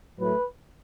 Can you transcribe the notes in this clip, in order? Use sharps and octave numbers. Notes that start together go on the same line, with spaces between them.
A2 F#3 A3 B4